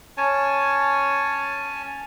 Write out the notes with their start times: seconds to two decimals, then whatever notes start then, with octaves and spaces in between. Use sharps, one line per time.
0.17 C#4 C#5 G#5 A5